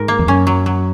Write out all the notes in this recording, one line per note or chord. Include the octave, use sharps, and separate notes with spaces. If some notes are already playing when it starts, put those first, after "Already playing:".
Already playing: G#2 A#4
A#3
E2
F#2 C#4
F#3
F#3